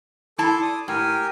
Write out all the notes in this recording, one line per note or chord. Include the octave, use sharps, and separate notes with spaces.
E4 A4 A5 C6 D6
D5 D#6
A2 G4 A#4 G#5